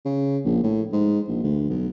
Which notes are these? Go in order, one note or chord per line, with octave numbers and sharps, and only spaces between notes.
C#3
A#1
A2
G#2
A#1
D2
B1